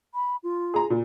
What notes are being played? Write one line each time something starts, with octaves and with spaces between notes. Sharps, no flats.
B5
F4
G#4 A#5
A#2